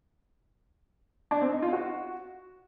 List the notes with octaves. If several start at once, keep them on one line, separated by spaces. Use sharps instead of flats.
D4
C4
D#4
F4
F#4